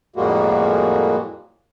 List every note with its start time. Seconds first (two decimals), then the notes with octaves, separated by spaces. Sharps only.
0.16 F2 A2 G3 G#3 A#3 F#4